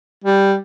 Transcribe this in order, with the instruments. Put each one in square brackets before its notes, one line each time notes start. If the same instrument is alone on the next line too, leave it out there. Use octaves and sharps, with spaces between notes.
[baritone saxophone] G3